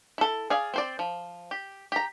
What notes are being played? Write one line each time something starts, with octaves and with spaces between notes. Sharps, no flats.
E4 A4
G#4 D5 F5
C4 C5 D5
F3
G4
G4 A#5